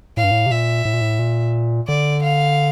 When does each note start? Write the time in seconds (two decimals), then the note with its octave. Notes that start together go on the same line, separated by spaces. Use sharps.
0.17 A2 F5
0.24 G2
0.31 A2
0.46 C3
0.51 A#2 E5
0.85 A2
0.93 A#2
1.01 A2
1.19 A#2
1.88 D3 D5
2.23 F5